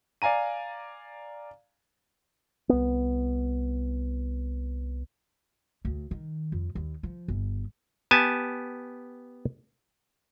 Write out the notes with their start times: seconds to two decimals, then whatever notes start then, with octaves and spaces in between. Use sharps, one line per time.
0.22 D5 F5 G#5 A#5 D#7
2.69 C2 B3
5.85 D2
6.11 D#3
6.52 F2
6.75 D#2
7.03 F3
7.28 G1
8.11 B3 G4 G#5 A5